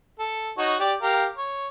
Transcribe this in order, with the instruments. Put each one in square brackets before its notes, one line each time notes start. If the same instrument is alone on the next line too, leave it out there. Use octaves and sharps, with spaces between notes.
[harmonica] A4
D#4 F#4 C#5
G4 D5
G4 A#4 F5
C#5